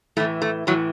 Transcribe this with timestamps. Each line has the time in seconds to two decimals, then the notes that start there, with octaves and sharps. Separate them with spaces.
0.17 A2 A3
0.20 E3
0.42 A3
0.67 A2 E3 F#3